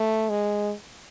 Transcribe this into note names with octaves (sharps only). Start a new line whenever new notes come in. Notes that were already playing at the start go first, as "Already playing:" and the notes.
Already playing: A3
G#3